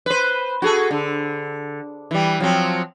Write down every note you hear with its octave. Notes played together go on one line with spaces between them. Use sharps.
B4 C5
F#4 G#4 A4
D3
E3 G3
F3 F#3 C4